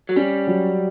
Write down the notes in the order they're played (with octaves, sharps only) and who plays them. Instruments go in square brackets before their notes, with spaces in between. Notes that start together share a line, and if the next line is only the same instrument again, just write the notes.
[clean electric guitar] F#3
[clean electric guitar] G3 [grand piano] C#4
[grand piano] F#3